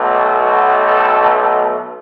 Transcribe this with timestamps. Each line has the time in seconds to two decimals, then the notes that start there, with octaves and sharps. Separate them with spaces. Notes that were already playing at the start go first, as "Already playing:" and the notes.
Already playing: B1 B2 A3
0.37 F#4
0.83 A4